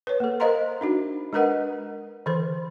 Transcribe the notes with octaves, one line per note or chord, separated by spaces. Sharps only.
B4 C#5
A#3 A4
A#4 C5 D#5 F5 A#5 C6
D4 D#4 F#4
G#3 D4 A#4 B4 D#5 F#5
D3 E3 A4 C5